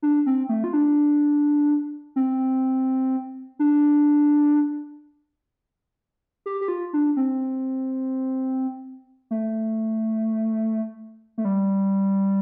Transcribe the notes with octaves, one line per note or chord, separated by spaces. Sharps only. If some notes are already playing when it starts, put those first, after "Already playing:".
D4
C4
A3
F4
D4
C4
D4
G4
G4
F4
D4
C4
A3
A3
G3